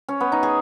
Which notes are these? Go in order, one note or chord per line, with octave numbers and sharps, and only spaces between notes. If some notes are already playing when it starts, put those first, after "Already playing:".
C#4
B3
D#4
G#4